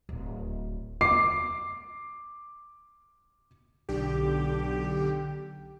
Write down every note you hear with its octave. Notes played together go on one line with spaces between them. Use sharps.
D1
D6 C7
B1 D3 G4